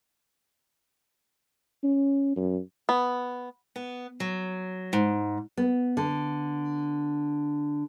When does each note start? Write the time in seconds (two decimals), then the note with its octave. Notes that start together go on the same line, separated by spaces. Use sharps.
1.83 C#4
2.36 F#2
2.89 B3
3.76 B3
4.20 F#3
4.93 G#2
5.57 B3
5.97 D3